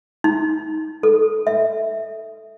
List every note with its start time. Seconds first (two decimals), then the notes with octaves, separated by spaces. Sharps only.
0.24 D#4
1.03 A4
1.47 E5